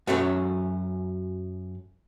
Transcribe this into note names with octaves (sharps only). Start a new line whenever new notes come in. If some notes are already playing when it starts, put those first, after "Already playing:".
F#2 F#3 A3 B3 C#4